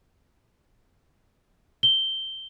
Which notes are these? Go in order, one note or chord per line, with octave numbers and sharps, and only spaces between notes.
G7